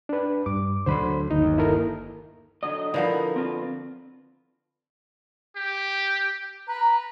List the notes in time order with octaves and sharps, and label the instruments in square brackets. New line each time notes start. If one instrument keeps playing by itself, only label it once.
[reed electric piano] D4 B4
[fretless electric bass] G2 [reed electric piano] D6
[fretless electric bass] D2 D3 F#3 [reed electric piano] C5 B5 C6
[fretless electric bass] G1 D#2 [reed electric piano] D#4
[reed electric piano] E4 A4 A#4
[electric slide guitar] D3 F#3 D#5
[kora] D3 F3 B3 [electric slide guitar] E4 A#4 B4
[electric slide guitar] C4 F4 B4
[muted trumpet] G4
[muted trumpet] B4 [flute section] A#5